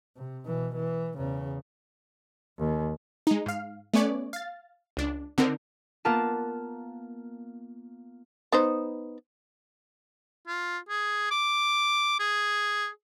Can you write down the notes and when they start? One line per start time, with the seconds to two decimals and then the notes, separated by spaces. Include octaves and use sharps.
0.16 C3
0.46 B2 E3
0.75 E3
1.17 E2 C#3
2.59 D#2
3.27 G#3 D#4
3.46 G#2 F5
3.94 A3 B3 C#4 C#5 D5
4.33 F5 A6
4.97 C#2 D4
5.38 D3 C4 D#4 A#4
6.05 A#3 B3 F4 A#4 A5
8.52 B3 D#4 C5
10.47 F4
10.89 G#4
11.31 D6
12.19 G#4